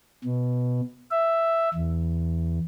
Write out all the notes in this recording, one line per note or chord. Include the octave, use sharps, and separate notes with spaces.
B2
E5
E2